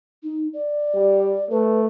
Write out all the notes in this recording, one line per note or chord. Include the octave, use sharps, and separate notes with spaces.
D#4
D5
G3
A3 B4